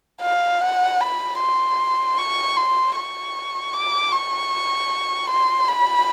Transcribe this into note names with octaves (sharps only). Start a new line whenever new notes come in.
F5
F#5
B5
C6
C#6
C6
C#6
D6
C#6
C6
B5